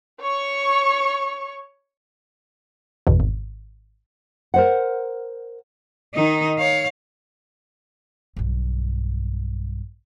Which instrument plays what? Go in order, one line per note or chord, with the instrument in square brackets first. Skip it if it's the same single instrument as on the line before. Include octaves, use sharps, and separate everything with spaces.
[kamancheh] C#5 C#6
[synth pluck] G1 E2 B2
G#1
[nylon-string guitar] A#4 C5 F#5
[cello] D#3 D#4
C#5 F5
[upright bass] B1 G2